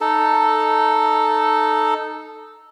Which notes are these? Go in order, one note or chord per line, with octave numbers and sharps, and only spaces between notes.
D#4 A4